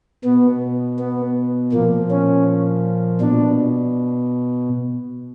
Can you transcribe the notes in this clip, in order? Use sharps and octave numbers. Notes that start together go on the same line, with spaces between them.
B2 B3
B3
A#2 F3 A#3
C#4
B2 D4